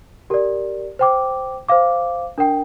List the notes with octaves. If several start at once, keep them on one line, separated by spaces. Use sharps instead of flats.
G4 A#4 D5
C5 G5 D6
C5 F5 D6
D4 A#4 G5